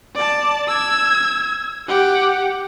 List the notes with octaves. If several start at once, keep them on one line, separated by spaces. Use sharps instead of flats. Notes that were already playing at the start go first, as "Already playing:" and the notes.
D5 A5
E6 G#6
G4 F#5